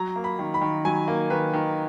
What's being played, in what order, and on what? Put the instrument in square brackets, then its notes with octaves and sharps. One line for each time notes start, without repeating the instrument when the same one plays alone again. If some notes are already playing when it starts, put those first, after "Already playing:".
Already playing: [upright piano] F#3 A#5
A#3
B5
D#3
B5
D#3
F#3 G#5
A#3
D#3 B4
D#3